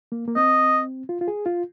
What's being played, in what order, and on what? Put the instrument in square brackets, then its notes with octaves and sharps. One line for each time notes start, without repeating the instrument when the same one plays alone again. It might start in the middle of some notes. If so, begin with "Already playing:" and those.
[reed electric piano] A#3
A#3
[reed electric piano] C4 [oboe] D#5
[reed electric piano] F4
F4
G#4
F4